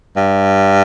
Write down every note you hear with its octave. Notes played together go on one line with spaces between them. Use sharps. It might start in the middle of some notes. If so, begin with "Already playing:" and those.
G2